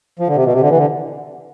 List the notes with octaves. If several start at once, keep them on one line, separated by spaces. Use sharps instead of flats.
F3
D3
C3
B2
C3
D3
E3
D3